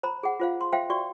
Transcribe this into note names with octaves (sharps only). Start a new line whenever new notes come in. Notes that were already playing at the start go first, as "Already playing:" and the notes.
C5 A#5 B5
G#4 F#5
F4 C5 F5
C6
C5 E5 F5 G5
F#4 D5 C#6